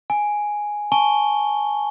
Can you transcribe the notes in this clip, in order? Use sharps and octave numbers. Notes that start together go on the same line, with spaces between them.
G#5
G#5 A5 C#6 G7